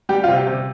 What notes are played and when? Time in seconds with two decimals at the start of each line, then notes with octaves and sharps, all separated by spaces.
0.09 G3 G4
0.24 F4
0.28 C3
0.37 G4
0.47 C3